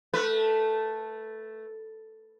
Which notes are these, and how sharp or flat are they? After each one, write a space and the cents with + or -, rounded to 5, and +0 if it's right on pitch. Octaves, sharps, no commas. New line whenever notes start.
A3 +0 B4 -25